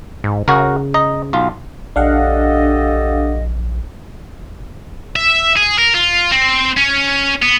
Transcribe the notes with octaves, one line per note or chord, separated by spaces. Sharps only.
G#2
C#3 F#4 A#4
D#5 A#5
B1 F4
A#1 D4 G4 A4 D#5 F5 F#5
E5
G#4
A#4
F4
C4
C#4
B3